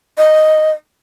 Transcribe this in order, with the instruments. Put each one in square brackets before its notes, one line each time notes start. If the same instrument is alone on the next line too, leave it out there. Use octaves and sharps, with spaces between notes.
[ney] D#5